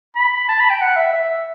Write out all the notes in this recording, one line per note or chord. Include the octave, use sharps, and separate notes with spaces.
B5
A5
B5
G5
F#5
E5
E5